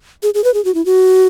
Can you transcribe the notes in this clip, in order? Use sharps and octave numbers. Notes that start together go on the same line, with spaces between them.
G#4
G#4
B4
G#4
F#4
E4
F#4